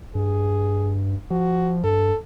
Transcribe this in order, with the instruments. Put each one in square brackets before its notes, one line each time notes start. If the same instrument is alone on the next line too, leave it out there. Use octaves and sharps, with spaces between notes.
[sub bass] G2 [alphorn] G#4
[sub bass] F3 [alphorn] F#4
[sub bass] G2 [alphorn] A4